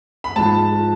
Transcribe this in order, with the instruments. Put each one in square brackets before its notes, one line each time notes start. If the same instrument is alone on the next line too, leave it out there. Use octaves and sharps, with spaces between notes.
[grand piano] B5
G#2 F3 A5
F3